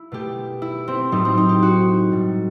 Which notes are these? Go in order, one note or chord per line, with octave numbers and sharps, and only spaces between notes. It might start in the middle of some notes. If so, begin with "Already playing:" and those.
Already playing: E4
B2 A3 G4
E4
C4
A2 F#3 A3 D#4
C4
D#4
G4
F#4
A2 G3